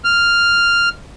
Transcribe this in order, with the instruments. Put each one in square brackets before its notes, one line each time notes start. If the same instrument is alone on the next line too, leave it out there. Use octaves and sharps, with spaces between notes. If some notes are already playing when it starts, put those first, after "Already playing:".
[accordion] F6